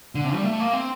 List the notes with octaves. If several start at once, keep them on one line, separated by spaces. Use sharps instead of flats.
D3
C3
G3
A3
A#3
C4